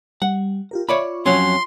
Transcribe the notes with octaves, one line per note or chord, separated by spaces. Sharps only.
G3 F#5
F4 G4 A#4
F4 C#5 D5 E5 B5 C#6
F2 F#3 C#4 C6